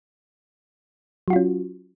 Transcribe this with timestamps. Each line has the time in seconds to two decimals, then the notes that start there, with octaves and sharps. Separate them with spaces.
1.28 F#3
1.30 F#4
1.33 F4
1.36 C#4